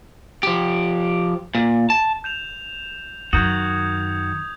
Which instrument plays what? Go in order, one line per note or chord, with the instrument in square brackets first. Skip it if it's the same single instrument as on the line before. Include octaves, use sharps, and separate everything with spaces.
[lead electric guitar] F3 G4
A#2
A5
[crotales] G6 E7 F7
[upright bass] F#2 [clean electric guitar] D#3 F#4 [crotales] D#6 G6 G#6